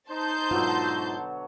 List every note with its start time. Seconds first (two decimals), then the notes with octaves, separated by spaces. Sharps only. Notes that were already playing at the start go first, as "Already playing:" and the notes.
0.10 D#4 C5 A5 C6 G6
0.51 G#2 B2 D3 F#3 F4